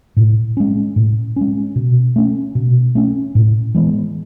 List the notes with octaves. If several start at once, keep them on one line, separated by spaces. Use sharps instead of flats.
A2
G#3 C#4
A2
G#3 C#4
B2
A3 C#4
B2
A3 C#4
A2
E3 G#3 B3